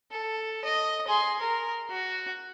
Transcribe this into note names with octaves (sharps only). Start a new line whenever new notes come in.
A4
D#5
G#4 C6
A#4
F#4